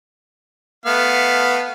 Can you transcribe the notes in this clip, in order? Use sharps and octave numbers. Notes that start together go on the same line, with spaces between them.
A3 B3 F5